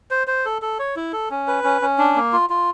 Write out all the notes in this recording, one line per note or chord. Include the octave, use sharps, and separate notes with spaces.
C5
C5
A4
A4
C#5
E4
A4
C#4
B4
C#4
C#4
D4
A#3
F4
F4